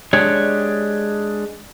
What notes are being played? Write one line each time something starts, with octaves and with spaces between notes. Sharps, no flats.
G#3 D4 G4 C#5